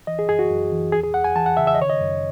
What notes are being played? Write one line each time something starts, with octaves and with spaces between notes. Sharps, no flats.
E3 D#5
G#4
F#2 G#4
F#4
F#2
E3
E2 G#4
G#4
E2 F#5
G#5
E3 A5
F#5
C#3 E5
E5
D#5
D#3 C#5
D#5
F#2